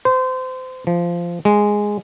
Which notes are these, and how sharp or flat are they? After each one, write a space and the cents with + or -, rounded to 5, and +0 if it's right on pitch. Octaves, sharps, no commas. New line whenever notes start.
C5 -30
F3 -15
G#3 -5